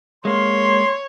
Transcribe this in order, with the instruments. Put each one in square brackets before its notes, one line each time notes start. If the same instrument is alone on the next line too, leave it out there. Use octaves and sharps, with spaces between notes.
[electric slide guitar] G#3 A#3 [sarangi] C#5 [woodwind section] C6